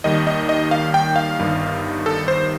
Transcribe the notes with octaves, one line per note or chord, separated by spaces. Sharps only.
D#2 D#3 G3 D#5
D#5
D#5
F5
G5
F5
G1 G2 D#3 G3
A4
C5